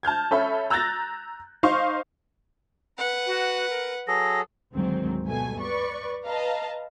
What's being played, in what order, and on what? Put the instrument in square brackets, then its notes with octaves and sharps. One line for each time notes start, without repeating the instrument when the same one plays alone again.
[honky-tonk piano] A5 F6 G6 G#6
C#4 A4 E5 B5
A#5 E6 F#6 G6 A6 A#6
D#4 C5 F5 C6 C#6
[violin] B4 F#5
[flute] F#4
A#4
[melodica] F#3 G#4 A4 [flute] A#6
[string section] D2 G#2 D#3 F#3 C4
G2 B2 A3 G#5
B4 D5 C#6
B4 D#5 F5 A5 A#5